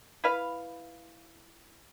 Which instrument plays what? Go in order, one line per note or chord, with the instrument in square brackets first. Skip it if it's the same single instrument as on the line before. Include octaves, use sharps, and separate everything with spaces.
[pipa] E4 B4 F5